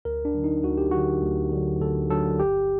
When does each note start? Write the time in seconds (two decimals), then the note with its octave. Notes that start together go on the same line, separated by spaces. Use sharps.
0.05 D2 A#4
0.25 D4
0.34 D3 F#3
0.44 D#4
0.64 D2 F#4
0.78 G4
0.91 D3 F#3 F#4
1.22 D2
1.52 D3 F#3
1.81 D2 A4
2.10 D3 F#3 A4
2.40 G1 G4